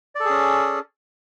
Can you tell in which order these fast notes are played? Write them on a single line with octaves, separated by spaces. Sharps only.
D5 A4 G#4 C#4